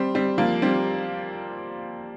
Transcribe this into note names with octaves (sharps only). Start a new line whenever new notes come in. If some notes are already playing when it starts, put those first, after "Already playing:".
Already playing: G3 C4
G3 C4
F3 A#3
G3 C4